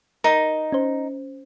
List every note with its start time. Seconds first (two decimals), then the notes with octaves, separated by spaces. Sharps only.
0.24 D#4 A#4
0.72 C#4 C5